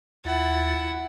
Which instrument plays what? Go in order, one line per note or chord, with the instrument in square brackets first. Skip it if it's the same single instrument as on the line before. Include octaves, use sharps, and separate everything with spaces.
[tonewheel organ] D#2 F4 A6 [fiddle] E4 F#5